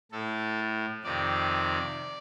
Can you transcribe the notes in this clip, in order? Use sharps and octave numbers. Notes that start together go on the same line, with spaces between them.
A2 A4
F2 C3 D#3 D5